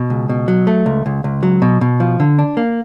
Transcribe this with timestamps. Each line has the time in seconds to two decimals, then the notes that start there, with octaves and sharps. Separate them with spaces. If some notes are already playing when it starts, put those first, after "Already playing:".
Already playing: B2
0.10 C#2
0.29 B2
0.48 F#3
0.67 A3
0.86 C#2
1.06 C#2
1.24 C#2
1.43 F#3
1.62 B2
1.81 B2
2.00 F3
2.20 D3
2.39 D4
2.57 A#3